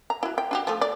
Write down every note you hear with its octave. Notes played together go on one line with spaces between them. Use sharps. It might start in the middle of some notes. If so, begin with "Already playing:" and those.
A#5
E4 F#4
G5
D4 F#4 G4
F3 A3
D5